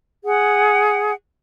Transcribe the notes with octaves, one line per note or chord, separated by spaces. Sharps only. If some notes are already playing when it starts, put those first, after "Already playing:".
G#4 F#5